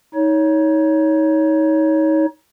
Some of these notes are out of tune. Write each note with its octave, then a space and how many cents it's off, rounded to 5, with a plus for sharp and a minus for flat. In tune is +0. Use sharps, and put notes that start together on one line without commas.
D#4 +30 C#5 +10